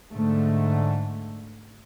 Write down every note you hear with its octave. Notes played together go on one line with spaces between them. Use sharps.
G#2 D3 A3